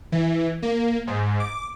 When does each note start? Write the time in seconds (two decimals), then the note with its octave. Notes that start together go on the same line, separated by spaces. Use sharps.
0.12 E3
0.62 A#3
1.07 G#2
1.40 D6